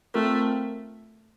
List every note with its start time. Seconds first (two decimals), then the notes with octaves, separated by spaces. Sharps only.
0.14 A3 C4 F4 A#4